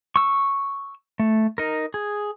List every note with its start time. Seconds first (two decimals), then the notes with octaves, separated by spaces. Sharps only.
0.16 C#6 E6
1.19 A3
1.58 D#4 A#4
1.94 G#4